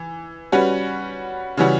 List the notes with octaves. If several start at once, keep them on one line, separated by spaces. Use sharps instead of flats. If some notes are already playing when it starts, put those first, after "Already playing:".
Already playing: E3
G3 C#4 F#4 B4
C#3 E3 G3 C#4 F#4